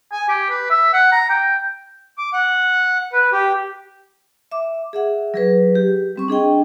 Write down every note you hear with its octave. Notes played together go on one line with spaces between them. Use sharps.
G#5
G4
B4
E5
F#5
A#5
G5
D6
F#5
B4
G4
E5 D6
G#4 E5 F#5
F#3 G#4 B4
G4
G3 C4 C#6
D4 G#4 D#5 G5